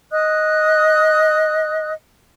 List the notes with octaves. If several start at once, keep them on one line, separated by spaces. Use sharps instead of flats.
D#5 D#6 F#6